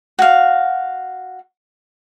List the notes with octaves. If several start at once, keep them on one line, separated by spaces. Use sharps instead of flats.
F#4 F5